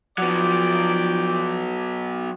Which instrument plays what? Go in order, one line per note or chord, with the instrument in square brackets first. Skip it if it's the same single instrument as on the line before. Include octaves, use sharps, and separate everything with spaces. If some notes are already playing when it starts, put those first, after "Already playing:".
[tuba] F3 [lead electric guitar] F#3 B3 [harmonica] D5 G5